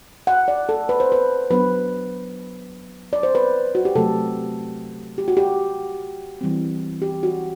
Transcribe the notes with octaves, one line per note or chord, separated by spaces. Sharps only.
F#5
D5
A4
B4
C5
B4
F#3 B3 D4 B4
D5
C5
B4
F#4
G4
C3 F#3 A3 A4
G4
F#4
G4
E3 G3 C4
G4
F#4